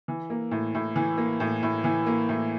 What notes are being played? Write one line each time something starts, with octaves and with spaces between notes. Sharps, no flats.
E3
A#3
A2
A2
E3
A#3
A2
A2
E3
A#3
A2